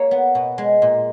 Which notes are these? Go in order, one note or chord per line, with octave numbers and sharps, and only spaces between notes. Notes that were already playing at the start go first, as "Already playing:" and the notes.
Already playing: A#3 G#4 C#5
B3
B2
G#3
A#2